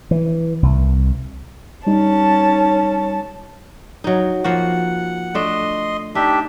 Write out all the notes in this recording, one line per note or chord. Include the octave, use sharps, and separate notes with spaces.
E3
C2
G3 C#4 D#4 A5
F#3 D#4
F3 A#3 F#4 F#5
A3 D4 D#5 C6
D4 D#4 G4 E5